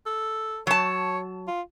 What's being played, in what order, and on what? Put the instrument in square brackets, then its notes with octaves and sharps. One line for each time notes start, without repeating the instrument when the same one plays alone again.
[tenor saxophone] A4
[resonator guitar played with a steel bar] F#3 A5 [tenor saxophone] C#5
[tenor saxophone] F4